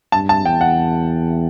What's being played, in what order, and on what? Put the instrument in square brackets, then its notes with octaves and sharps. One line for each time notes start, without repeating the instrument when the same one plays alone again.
[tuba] G2 [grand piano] A5
[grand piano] A5
[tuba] E2 [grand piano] G5
[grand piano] F#5